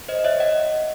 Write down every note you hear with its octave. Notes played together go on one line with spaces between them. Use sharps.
C5 D#5
D#5
C#5 E5
D#5 F#5